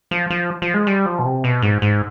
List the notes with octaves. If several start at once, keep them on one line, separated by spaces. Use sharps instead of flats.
F3
F3
F3
G#3
G3
F3
B2
C3
B2
G#2
G#2